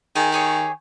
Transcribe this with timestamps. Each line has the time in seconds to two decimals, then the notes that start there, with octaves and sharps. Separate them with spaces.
0.16 D#3 G#4
0.32 G4 G#4 C#5